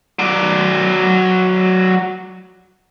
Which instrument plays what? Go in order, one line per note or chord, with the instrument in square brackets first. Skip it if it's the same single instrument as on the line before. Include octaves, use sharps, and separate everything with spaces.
[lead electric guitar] F#3 D5